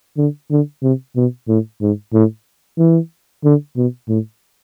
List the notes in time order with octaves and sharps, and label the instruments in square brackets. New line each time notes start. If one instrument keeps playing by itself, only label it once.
[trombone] D3
D3
C3
B2
A2
G#2
A2
E3
D3
B2
A2